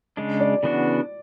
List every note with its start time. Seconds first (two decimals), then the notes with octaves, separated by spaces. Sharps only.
0.17 C#3 G#3 D4
0.40 D5
0.63 C#3 E3 B3 D4 F#4